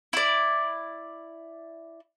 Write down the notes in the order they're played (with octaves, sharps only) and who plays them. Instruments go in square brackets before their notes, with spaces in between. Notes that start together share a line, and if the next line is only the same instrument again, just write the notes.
[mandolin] E4 D5